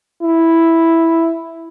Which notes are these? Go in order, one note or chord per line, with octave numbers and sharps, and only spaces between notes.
E4